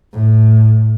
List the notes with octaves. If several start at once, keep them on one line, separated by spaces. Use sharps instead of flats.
A2